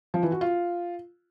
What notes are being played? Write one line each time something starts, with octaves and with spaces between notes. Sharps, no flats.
F3
E3
F#4
F4